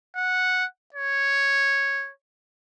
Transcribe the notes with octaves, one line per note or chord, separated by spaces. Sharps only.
F#5
C#5